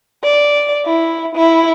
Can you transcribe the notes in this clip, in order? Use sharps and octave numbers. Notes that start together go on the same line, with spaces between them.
D5
E4
E4